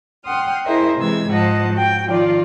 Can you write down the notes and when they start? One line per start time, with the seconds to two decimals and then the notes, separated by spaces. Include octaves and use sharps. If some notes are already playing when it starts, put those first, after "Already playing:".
0.24 F#5 G5 C6 D#6 F6
0.65 E4 G#4 A#4 C5 D#5 E5
0.98 C3 E3 G#3 E6 G#6
1.29 G#2 F3 D#5 F#5 A5
1.73 F#4 G5
2.07 D#3 F3 F4 D5